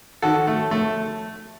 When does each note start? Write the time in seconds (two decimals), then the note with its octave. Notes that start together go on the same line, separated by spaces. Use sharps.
0.22 D#3 F#4 A4
0.47 A3
0.71 A3